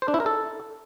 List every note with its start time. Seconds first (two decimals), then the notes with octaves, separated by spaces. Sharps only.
0.02 C5
0.08 D4
0.14 E4
0.20 A#4
0.26 A4